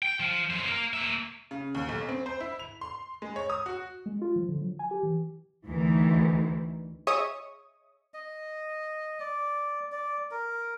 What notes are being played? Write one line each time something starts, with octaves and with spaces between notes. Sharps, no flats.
G5
F3
F#2 C5
A#3 A#4
A#3 E5
C#3
D#2
B1
C4
C5
E4
F7
C6
G#3
C#5
D#6
F#4
G#3
F4
F3
D3
F#3
G#5
G4
E3
D2 D#3 E3
G#4 C#5 D#5 E5 C#6 D#6
D#5
D5
D5
A#4